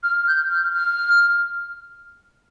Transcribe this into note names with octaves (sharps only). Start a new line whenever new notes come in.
F6
G6
F6
F6